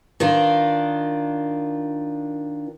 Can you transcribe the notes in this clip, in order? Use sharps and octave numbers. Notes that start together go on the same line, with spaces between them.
D#3 D4 F4